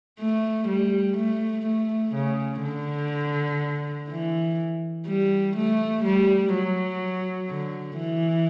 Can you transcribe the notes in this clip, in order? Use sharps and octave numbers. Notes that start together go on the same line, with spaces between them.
A3
G3
A3
A3
C#3
D3
E3
G3
A3
G3
F#3
D3
E3